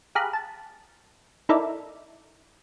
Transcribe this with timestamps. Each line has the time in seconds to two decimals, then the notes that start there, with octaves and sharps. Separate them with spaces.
0.15 G4 G#4 F5 A#5 B5 F#6
0.33 A5
1.49 D#4 E4 A4 A#4 D5 E5